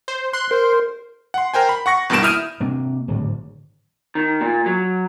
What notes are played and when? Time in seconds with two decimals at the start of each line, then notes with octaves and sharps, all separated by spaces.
0.08 C5
0.33 C6 F#6
0.51 A#4 C5
1.34 F#5 C6
1.54 A#4 C5 G5 G#5
1.69 B5
1.86 F#5 C#6 A#6 C#7
2.10 E2 G2 B2 A#3 D7 E7
2.22 E4 E5 D#6 F6 G6 D#7
2.60 C3 A#3 C4 D4
3.08 D1 G#1 D2
4.15 D#3
4.41 A#2
4.66 F#3